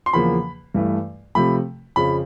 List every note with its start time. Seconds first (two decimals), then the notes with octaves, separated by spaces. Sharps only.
0.06 C6
0.13 E2 C#3 F3 A#3 B5
0.75 G2 E3 A3
1.35 C3 F3 A3 B5
1.96 F2 C#3 F3 B5